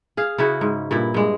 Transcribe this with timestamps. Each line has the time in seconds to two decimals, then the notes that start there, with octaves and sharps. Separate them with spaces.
0.17 G#4 F5
0.38 C#3 E4 F#4
0.61 G#2
0.91 G2 A#2 E4
1.14 G2 G#3